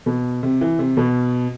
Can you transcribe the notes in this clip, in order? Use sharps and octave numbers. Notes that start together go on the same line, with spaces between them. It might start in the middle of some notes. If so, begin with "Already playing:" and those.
B2
C3
E3
C3
B2